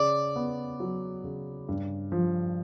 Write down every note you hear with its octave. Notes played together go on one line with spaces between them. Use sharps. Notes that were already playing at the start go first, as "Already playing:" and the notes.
Already playing: C#3 D5
B3
F#3
C#3
G2
F3